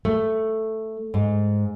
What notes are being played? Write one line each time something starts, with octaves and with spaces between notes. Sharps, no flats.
A3
G#2